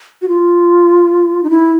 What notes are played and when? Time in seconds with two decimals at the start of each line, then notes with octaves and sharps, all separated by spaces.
0.22 F#4
0.28 F4
1.43 D#4
1.50 E4